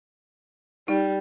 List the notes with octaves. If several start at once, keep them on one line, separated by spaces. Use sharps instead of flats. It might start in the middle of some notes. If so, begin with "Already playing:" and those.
G3 D#4